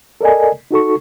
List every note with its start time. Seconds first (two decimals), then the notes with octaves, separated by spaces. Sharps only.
0.21 A4 A#4 D5 D#5 G#5
0.71 D#4 F#4 A4 C#6